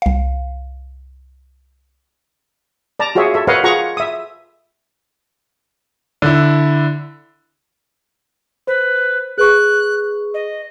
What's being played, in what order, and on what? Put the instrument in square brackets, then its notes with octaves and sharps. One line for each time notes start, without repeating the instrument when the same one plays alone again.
[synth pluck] C2 F5
[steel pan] D5 A5 A#5
F4 F#4 G#4 C#5 E5
A4 E5
A#4 B4 C#5 D#5 F5 F#5
F4 G#4 F#5 A#5 C#6
E5 D#6
[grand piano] D3 E4
[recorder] B4 [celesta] C5
[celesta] G#4 B4 C#6 [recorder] F#6
[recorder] D#5